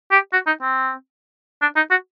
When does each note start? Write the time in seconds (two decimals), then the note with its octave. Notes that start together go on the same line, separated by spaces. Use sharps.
0.12 G4
0.33 F#4
0.47 D#4
0.62 C4
1.62 D4
1.76 D#4
1.91 F#4